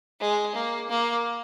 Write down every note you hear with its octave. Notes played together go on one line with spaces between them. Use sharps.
G#3
A#3
A#3